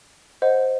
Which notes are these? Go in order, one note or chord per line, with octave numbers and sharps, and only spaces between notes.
C5 D#5 F#5